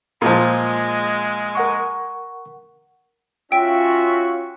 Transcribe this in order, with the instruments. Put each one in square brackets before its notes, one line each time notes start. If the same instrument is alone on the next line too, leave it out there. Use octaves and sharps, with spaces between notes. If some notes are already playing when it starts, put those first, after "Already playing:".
[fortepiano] A#2 F3 [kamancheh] G#3
[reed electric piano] A#4 F#5 C#6
[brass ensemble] C#4 F4 F#4 [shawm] E5 [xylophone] G5